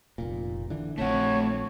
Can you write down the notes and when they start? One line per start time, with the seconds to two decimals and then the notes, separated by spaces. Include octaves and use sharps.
0.18 F1 A#2
0.70 D3 E3
0.98 A#1 A3 C4 C#5 F#5